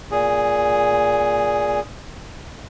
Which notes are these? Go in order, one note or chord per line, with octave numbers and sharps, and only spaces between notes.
A#2 G#4